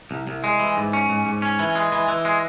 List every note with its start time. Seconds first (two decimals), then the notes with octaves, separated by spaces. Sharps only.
0.11 C2
0.27 C2
0.44 G#3
0.60 E3
0.77 G#2
0.93 C#4
1.09 G#2
1.26 G#2
1.42 C#4
1.59 E3
1.76 G#3
1.92 E3
2.08 E3
2.25 G#3